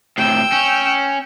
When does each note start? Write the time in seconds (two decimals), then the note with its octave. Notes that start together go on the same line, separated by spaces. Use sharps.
0.18 A2 C3 G5 E6
0.52 C#4